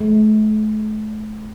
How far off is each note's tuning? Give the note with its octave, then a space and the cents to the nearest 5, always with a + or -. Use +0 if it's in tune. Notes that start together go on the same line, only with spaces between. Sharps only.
A3 -40